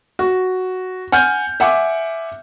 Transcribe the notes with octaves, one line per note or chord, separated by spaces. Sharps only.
F#4
F#5 G#5 F6 G6
E5 F#5 G#5 D6